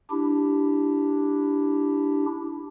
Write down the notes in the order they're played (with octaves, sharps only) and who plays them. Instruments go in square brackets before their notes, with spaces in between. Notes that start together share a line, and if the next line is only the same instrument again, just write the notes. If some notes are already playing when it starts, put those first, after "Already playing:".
[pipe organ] D4 E4 G4